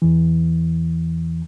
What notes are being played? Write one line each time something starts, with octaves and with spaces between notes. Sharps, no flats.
E2 E3